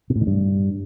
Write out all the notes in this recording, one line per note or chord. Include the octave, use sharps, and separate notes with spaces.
B2
A2
D#3
G2